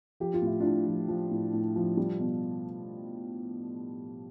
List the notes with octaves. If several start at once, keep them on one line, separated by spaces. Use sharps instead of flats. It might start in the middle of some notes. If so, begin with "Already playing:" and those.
F3 G4
F4
A2 E4
A2 D4 F4
F3
F3
A2
A2
F3
G3
B2